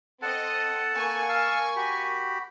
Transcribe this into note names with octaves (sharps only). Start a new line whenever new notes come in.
C4 A4 D#5 F#5 A5
A#3 G#5 C#6
F5 A5 E6
F#4 G4 B5